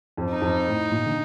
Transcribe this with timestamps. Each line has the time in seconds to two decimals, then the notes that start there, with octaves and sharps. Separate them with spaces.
0.17 F2
0.30 D#4
0.41 F2
0.67 A2
0.91 A#2
1.06 D3